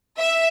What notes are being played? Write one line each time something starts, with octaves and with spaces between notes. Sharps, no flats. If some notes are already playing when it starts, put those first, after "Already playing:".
E5